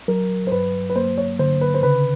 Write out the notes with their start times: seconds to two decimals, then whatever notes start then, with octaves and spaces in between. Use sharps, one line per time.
0.08 F#3 A#4
0.47 C5
0.51 G2 B4
0.89 B4
0.96 A#3 C5
1.18 C#5
1.39 D3 C5
1.61 B4
1.74 C5
1.83 C#3 B4